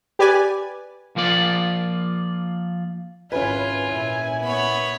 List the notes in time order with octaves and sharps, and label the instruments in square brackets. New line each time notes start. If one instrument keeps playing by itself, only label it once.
[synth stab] G4 B4 D5 G#5
[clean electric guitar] F3 A#3 F4 D5
[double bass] G#1 E4 [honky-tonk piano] C#4 B4 [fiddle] F4 [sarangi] G#5
[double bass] A#2 E4
[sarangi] B3 [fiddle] C#5 B5